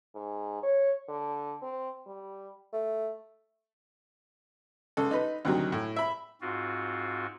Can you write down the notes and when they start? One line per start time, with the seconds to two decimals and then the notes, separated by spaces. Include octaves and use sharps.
0.15 G#2
0.63 C#5
1.08 D3
1.62 C4
2.06 G3
2.73 A3
4.97 C#2 A4
5.11 D#4 B4
5.45 D2 C3 D#3 F#3
5.72 A2
5.96 E5 B5
6.41 G#2 C4 F4 F#4